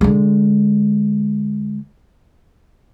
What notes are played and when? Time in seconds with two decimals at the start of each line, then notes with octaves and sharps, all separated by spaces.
0.01 D3 G#3